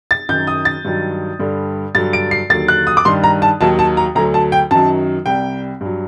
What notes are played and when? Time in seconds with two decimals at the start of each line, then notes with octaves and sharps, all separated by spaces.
0.11 A6
0.29 F#2 D#3 F#3 G6
0.47 D#6
0.65 A6
0.85 G2 D#3 F#3
1.39 G2 D3 G3
1.95 G2 D3 F#3 A6
2.13 D7
2.31 C7
2.50 D#2 D3 F#3 A6
2.68 F#6
2.87 D#6
2.97 D6
3.05 G2 D#3 G3 C6
3.24 A#5
3.42 A5
3.61 D#2 D#3 F#3 A5
3.79 A5
3.97 A#5
4.15 D2 D3 F#3 A#5
4.34 A5
4.52 G5
4.71 F#2 D#3 F#3 A5
5.26 C2 C3 G3 G5
5.81 G2 F#3